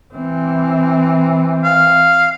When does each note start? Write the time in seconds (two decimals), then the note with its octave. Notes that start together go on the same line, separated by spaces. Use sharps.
0.14 E3 C4
1.64 F5